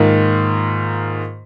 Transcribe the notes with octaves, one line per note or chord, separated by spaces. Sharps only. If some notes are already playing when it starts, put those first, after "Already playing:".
Already playing: G#2 D#3 A#3 F4